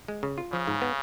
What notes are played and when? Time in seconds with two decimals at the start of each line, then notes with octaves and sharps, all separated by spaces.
0.08 G#3
0.23 C#3
0.38 F4
0.52 C#3 F3
0.68 G#2
0.82 B3